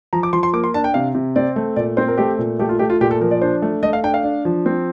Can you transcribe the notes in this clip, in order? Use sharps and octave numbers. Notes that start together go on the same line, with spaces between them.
F3 A#5
D6
F3 C6
C6
A#3 D6
C6
D4 A5
G5
C3 F5
C3
C4 D5
A3
A#2 D5
C4 C5
A#4
A3 G4
A#2
A3 G4
F4
A3 G4
F4
A#2 G4
A4
F3 A#4
D5
D4 C5
A3
A3 D#5
F5
D4 G5
F5
D4
F3
C4